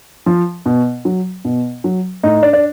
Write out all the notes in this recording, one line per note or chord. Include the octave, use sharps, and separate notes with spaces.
F3
B2
F#3
B2
F#3
A2 D#4
D4
D4